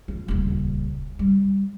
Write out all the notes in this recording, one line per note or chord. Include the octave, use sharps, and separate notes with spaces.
F4
D#1 C#2
G3